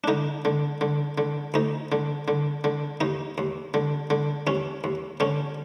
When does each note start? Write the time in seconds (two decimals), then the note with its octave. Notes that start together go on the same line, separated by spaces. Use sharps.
0.04 D4
0.08 D3 D#4
0.45 D3
0.81 D3
1.18 D3
1.54 D2 D#4
1.92 D3
2.28 D3
2.64 D3
3.01 D#2 D#4
3.38 D#2
3.74 D3
4.10 D3
4.47 D#2 C#4
4.84 D#2
5.20 D3 C#4